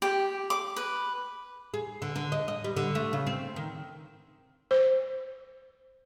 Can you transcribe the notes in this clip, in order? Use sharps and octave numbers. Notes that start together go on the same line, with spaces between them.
G4
D6
B4
G#4
D3
D3
D#5
D#5
G3
D3
A3
C#3
C4
D#3
C5